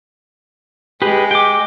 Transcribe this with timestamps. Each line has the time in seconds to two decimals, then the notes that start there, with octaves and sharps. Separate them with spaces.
1.02 G#3 G4 G#4 B4
1.31 G5 D6